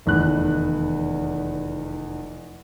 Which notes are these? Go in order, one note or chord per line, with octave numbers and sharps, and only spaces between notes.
F1 E2 D#3 F#6